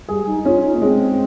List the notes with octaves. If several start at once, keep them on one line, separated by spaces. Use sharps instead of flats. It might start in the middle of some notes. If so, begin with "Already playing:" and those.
G3 G#4
D#4
C#4 F4
D#4
A#3
G#3 C4